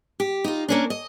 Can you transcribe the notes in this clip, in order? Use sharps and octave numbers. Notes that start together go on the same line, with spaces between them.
G4
D#4 F4
A#3 C#4 D4
D#5